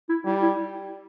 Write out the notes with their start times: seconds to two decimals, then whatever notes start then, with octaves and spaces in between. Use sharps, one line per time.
0.09 E4
0.26 G3 E4
0.42 E4